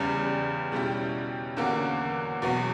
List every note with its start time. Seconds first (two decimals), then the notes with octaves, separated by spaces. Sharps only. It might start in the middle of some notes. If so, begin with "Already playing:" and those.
Already playing: E2 C#3 G3
0.72 B2 G3 C#4 E4 G4
1.57 E2 D3 A#3 C#4 F#4
2.42 E2 B2 F#3 B3